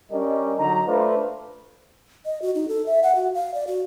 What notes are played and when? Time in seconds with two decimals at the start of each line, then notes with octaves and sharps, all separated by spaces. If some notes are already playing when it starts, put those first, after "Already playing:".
0.11 G3 C#4 D4 A#4 D#5
0.58 D3 F#3 D#4 A#5
0.86 A3 D4 F4 A4 B4 C5
2.25 D#5
2.42 F#4
2.55 D#4
2.68 A4
2.86 E5
3.03 F#5
3.15 F#4
3.34 F5
3.54 D5
3.67 F#4